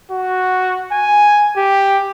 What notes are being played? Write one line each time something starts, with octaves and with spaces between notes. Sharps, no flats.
F#4
G#5
G4